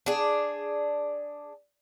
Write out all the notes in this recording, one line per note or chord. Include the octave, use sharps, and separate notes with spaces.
D4 G#4